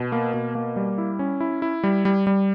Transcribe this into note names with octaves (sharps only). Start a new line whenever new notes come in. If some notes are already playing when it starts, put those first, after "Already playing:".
Already playing: B2
A#3
B2
A#3
G3
E4
C#4
E4
E4
G3
G3
G3